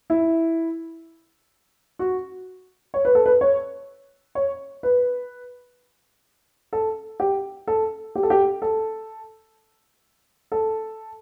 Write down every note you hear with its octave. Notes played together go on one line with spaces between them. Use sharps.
E4
F#4
C#5
B4
A4
B4
C#5
C#5
B4
A4
G4
A4
G4
A4
G4
A4
A4